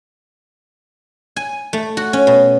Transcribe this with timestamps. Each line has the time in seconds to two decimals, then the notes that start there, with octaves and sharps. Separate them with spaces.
1.36 G#5
1.73 A3
1.97 F#4
2.13 C#4
2.27 B2